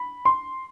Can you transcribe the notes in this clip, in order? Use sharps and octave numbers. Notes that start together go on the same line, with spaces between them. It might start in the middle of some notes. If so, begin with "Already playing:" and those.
Already playing: B5
C6